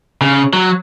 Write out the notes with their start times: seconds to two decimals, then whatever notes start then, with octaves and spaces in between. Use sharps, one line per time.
0.21 C#3
0.53 F#3